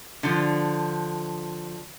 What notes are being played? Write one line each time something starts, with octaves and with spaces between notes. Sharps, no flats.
D3 F3